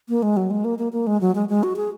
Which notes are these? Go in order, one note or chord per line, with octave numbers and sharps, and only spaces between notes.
A#3
G#3
F#3
G#3
A#3
A#3
A#3
G#3
F#3
G#3
G#3
F#4
G#4